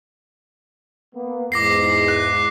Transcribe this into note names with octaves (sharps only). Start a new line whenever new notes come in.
A#3 B3
E2 G#2 D6 A#6 C7
F#6